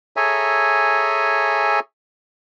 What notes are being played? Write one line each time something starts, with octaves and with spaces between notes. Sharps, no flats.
G#4 A4 C#5 E5 G#5 A#5